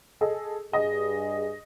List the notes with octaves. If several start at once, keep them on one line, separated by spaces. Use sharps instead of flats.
G#4 A4 D#5
G2 G#4 D#5